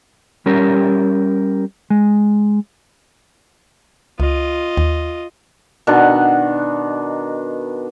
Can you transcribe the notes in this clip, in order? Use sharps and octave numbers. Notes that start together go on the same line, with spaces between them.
G3 C#4 G4 A#4
G#3
C#2 F4 D#5
D#2
B2 D#3 D4 F#5